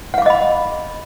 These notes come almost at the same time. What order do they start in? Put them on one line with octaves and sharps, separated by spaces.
F#5 F5 D6 D#5 B5